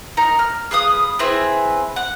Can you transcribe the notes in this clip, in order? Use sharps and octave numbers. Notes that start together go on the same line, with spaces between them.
D#4 A#4 A#5
F6
G#4 B4 F5 D#6
C4 E4 G#4 B4
F#5